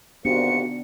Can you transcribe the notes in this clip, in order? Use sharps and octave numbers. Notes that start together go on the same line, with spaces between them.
G#1 A#2 B3 C4 D4 F#4 G4 C#7